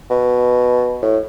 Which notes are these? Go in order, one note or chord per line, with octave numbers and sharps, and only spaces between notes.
B2
A2